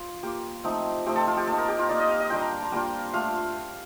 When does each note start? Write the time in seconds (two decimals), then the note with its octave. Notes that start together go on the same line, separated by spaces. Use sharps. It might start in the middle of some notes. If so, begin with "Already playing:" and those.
Already playing: F4
0.23 A#3 F4 G4
0.64 F3 A3 C4 D#4
1.06 F3 A3 C4 D#4 G4
1.16 A4
1.27 F4
1.37 G4
1.47 A#3 D#4 A4
1.58 A#4
1.68 G4
1.79 F4
1.89 A#3 D#4 D5
2.00 D#5
2.10 F5
2.20 D#5
2.30 G3 A#3 D4 F4 G5
2.41 A#5
2.51 A5
2.62 A#5
2.72 G3 A#3 D4 F4 G5
3.14 A3 D4 F4 F5